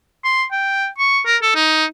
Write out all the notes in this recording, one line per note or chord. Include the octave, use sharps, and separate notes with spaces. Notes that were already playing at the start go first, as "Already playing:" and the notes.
C6
G5
C#6
A#4
A4
D#4